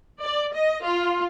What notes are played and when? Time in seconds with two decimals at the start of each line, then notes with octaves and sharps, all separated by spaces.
0.20 D5
0.53 D#5
0.83 F4